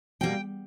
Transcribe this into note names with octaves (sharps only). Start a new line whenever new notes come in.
B2 G3 A#3 G5